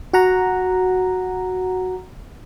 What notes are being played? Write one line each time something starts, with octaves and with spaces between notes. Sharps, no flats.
F#4 F#5 A#5